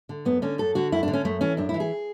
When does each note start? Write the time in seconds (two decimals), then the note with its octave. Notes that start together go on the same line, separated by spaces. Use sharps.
0.09 D3
0.25 F#2 B3
0.42 D3 C#4
0.58 F#2 A4
0.75 D3 F#4
0.92 F#2 E4
1.03 D4
1.08 D3
1.13 C#4
1.25 F#2 A3
1.41 E3 C#4
1.57 F#2 D4
1.69 E4
1.74 E3
1.80 G#4